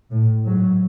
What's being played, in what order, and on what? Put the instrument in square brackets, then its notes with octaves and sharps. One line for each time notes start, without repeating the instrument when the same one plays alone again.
[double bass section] A2
[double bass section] G#2 [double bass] F#3